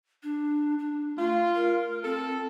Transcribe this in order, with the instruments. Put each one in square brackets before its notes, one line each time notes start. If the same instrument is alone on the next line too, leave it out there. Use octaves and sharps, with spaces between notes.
[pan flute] D4
D4
[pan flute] A3 [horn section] F4
[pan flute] A#4
[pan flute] C4 [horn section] A4